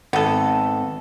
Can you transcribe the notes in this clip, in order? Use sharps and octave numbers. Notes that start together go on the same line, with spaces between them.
G#1 B3 A4